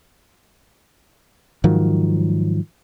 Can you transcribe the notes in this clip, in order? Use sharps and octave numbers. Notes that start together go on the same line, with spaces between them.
G#2 D#3 F3 F#3